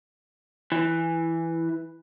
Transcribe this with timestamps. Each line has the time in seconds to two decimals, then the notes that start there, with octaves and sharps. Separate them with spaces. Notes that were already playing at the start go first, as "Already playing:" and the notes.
0.72 E3